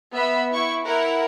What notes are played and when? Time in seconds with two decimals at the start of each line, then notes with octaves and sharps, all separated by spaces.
0.16 B3 E5 B5
0.51 E4 C#6
0.84 E4 A#4 F#5